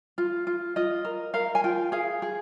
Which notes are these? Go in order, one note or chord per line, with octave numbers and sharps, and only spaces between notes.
F4
F4
F4 D#5
A#4
A#4 F5
G#5
F4 G5
G#4 F5
G#4